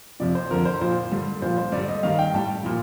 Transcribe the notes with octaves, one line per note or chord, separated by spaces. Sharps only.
F2 C3 F3 D5
C5
F2 D3 F3 A#4
C5
A#2 F3 C5
G2 D3 G3
A#2 F3 C5
C5
G2 D3 G3 D5
D#5
G2 D#3 G3 F5
G5
A2 G3 A5
A#2 F3